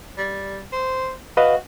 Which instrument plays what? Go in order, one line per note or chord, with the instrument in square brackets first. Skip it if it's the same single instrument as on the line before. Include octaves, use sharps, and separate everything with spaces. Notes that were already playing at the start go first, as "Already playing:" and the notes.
[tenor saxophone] G3
C5
[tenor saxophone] F#4 [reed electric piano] B4 D#5 F5